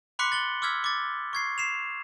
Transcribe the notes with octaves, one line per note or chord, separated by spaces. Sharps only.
B5 C6 D6 F#6 B6 C#7
A6 F#7 G7
D6 E6 F6 G#6 B6
D6 A6
C#6 G#6 C7
C7 E7 F7